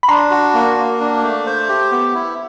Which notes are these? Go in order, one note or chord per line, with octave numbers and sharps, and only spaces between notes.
B5
D4 A#5 C6
F#4
A#3
A#3
D4
A3
C5
G4
B3
E4